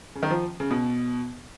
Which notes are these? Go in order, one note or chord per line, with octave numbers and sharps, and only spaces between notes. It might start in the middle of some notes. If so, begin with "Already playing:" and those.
C#3
D#3
F3
C#3
B2